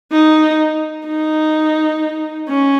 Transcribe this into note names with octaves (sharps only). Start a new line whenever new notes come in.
D#4
D#4
C#4